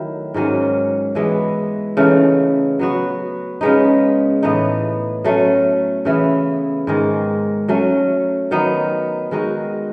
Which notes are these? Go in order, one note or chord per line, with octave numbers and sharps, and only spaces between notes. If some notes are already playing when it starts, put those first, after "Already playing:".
Already playing: D#3 F#3 A3 E4
G#2 D#3 F#3 C#4
E3 G#3 B3 E4
C#3 E3 A3 D#4
F#3 B3 F#4
C#3 G#3 B3 D#4
A2 E3 B3 D#4
F#3 A3 C#4
C#3 E3 B3 E4
G#2 D#3 G#3
F#3 A3 C#4
D#3 F#3 B3 D#4
D#3 G#3 D#4 F#4